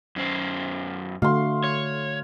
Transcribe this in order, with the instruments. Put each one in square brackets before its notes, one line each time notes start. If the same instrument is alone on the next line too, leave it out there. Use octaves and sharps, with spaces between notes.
[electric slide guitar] F#2 C#4 C5
[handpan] D3 A3 F#4 [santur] F5 C6
[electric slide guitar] C#5